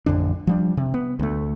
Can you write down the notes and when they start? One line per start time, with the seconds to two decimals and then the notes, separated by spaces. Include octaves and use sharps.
0.06 A1 F2 D3 D4
0.47 F3 G3 D4
0.77 C3
0.94 B3
1.19 D2 A3